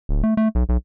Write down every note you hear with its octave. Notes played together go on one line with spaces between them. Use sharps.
D1
A3
A3
B1
B1